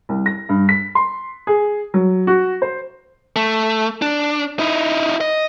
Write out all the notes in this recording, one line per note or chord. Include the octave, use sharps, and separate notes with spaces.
C2
A#6
G2
B6
C6
G#4
F#3
F#4
C5
A3
D4
D#4 E4
D#5